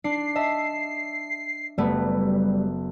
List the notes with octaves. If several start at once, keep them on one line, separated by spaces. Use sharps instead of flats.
D4 C7
D#5 E5 A5
F#1 G3 A3 B3